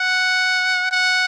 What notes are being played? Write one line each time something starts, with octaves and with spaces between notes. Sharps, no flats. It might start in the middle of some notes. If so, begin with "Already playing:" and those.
Already playing: F#5
F#5